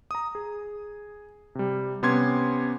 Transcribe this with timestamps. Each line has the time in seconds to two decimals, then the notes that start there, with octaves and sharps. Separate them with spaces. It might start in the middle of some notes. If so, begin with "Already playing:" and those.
0.11 A#5 D#6
0.35 G#4
1.55 C3 G3
2.02 C3 B3 C#4 C6 D6 G#6